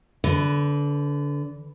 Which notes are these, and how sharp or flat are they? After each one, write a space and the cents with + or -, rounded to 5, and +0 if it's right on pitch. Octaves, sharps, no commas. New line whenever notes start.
D3 -25 B4 +0